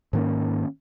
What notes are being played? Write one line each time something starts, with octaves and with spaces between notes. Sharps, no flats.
G#2 D#3 A#3 C#4